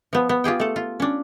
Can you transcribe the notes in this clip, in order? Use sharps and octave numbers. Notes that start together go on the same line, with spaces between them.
F3 B3
B3
F4 G4 G#4 G5
A3 A4
F4
C#4 D4